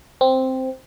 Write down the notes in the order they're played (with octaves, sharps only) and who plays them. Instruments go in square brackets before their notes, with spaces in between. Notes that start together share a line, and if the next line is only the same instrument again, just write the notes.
[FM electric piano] C4